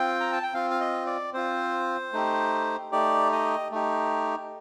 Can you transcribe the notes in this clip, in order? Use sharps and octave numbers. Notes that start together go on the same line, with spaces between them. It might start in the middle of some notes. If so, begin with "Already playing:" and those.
Already playing: C4 F4 G5
A#5
A5
G5
C4 F4 F5
F5
D#5
D5
C4 F4 C5
A3 D#4 G4
A3 D#4 G4 D5
D#5
A3 D#4 G4